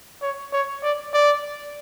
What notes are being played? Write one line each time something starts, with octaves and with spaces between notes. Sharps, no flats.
C#5
C#5
D5
D5